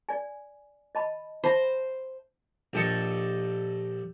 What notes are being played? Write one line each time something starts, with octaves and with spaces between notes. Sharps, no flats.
D5 G#5
D#5 A5 B5
C5 E5 A5 B5
A#1 G4 A4 D#5 C#6